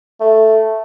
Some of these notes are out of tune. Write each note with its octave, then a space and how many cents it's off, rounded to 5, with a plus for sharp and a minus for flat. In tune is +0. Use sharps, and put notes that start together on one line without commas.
A3 +0